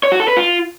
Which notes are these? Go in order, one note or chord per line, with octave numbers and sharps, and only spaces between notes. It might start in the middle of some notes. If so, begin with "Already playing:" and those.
C#5
F#4
A4
B4
F4